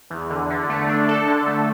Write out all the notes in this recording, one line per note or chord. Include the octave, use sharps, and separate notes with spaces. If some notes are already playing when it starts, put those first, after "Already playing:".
E2
D3
D3
A3
D4
A4
D3
A3